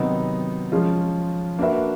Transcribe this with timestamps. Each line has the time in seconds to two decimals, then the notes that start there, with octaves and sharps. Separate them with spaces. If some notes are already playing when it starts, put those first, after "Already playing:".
Already playing: C3 D#3 F#3 B3 D#4
0.72 F3 G#3 C#4 F4
1.59 A#3 D4 F#4 B4 E5